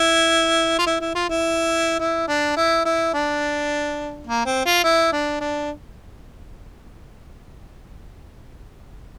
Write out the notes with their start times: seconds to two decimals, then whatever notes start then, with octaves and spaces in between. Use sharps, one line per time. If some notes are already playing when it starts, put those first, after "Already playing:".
Already playing: E4
0.78 F4
0.87 E4
1.00 E4
1.15 F4
1.29 E4
2.00 E4
2.28 D4
2.56 E4
2.85 E4
3.13 D4
4.27 A#3
4.46 C4
4.65 F4
4.84 E4
5.12 D4
5.41 D4